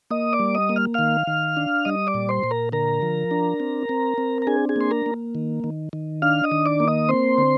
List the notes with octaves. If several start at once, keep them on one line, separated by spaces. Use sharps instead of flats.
A#3 D#5 D#6
D5 D6
G3
D#5 D#6
A#3
F6
D#3 F5 F6
D#3
D4
G3 D#5 D#6
D5 D6
A#2
C5 C6
A#2
A#4 A#5
D3 A#4 A#5
F3
D4
C4
C4
C4
A#5
D4 G#4 G#5
G#4 G#5
A#3 C6
A#4 A#5
A#3
D#3
D#3
D#3
D4 F5 F6
D#5 D#6
D#3
D5 D6
A#3
D#5 D#6
C4 C5 C6
D3